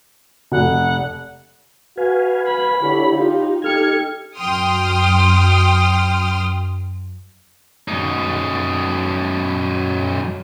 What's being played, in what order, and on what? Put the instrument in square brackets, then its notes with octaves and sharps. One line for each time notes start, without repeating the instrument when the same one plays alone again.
[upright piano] F1 [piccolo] F#5
[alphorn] F#4 [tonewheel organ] B4 F5 G#5
[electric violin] B5
[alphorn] D3 [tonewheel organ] E4 G4 C#5
[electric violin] D#4 [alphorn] F4 [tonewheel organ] G4
[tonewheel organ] D#4 A4 F6 [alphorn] G4 [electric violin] G#6 C#7
[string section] F#2 G5 C6 D#6 F6
[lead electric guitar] F#2 D#4